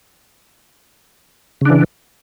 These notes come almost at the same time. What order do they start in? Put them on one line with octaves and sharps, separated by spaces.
C#3 D4 E3